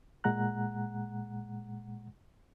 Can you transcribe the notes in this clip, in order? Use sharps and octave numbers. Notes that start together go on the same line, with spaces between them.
A#2 G#3 F#5 A#5 F#6